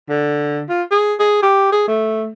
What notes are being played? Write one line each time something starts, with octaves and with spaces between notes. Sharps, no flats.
D3
F4
G#4
G#4
G4
G#4
A3